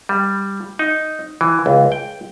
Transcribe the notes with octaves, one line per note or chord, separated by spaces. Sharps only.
G3
D#4
E3
C#2
G5